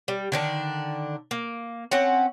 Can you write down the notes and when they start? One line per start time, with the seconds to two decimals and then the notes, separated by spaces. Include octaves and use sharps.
0.08 G3
0.32 D3 D#3 D4
1.31 A#3
1.91 C4 C#4 F#5